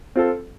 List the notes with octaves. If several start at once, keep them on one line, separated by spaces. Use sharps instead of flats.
C4 F4 A4